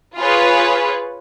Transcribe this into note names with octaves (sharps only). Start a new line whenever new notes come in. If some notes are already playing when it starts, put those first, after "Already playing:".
F4 G#4 B4 C#5